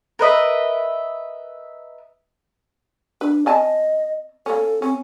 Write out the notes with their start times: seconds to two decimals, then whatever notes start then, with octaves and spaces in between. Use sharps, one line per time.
0.19 A#4 B4 D#5 E5
3.21 D4 B4
3.46 C4 D#5 G#5 A5
4.46 A#3 C#4 A4
4.82 C4 C#4